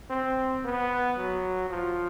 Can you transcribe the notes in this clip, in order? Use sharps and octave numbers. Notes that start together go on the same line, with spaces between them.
C4
B3
F#3
F3